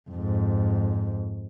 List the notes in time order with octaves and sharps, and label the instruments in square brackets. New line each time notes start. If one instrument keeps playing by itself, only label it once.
[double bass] F2 G#2